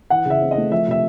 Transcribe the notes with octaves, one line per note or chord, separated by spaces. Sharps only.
E3 F#5
C#3 E5
C4
D#5
A3
F3 E5
C3 E5